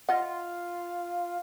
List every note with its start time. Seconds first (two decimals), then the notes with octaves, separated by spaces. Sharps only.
0.09 F4 D#5 F#5